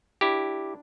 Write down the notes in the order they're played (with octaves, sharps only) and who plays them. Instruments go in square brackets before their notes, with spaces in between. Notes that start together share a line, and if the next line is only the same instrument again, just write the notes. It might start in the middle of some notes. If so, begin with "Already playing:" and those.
[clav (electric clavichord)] D4 E4 G4